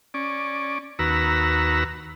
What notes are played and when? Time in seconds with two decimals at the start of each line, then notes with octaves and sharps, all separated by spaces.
0.14 C#4 D5
0.99 D#2 F#4 B4 A#5 E6